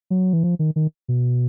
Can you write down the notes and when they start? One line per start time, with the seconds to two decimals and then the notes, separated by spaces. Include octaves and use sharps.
0.10 F#3
0.33 E3
0.43 F3
0.59 D#3
0.76 D#3
1.08 B2